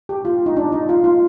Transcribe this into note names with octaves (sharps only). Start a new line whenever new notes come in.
G4
F4
D#4
D4
D#4
F4
F4